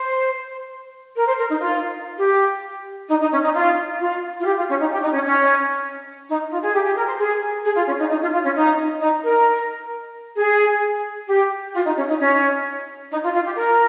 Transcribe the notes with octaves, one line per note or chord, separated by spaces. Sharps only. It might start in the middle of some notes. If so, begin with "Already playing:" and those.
Already playing: C5
A#4
C5
A#4
D#4
F4
G4
D#4
D#4
C#4
D#4
F4
F4
F4
G4
F4
C#4
D#4
G4
D#4
C#4
C#4
D#4
F4
G#4
G4
G4
A#4
C5
G#4
G#4
F4
C#4
D#4
D#4
F4
F4
C#4
D#4
D#4
A#4
G#4
G4
F4
D#4
C#4
D#4
C#4
D#4
F4
F4
G4
A#4